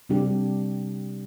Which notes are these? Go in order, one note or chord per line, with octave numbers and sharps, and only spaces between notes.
C3 G3 D4 G4